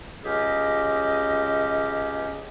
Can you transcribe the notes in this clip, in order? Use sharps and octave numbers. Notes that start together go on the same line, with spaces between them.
C#2 C#4 G4 G#4 D#5